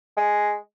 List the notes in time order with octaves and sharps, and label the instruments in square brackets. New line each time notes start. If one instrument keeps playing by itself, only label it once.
[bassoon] G#3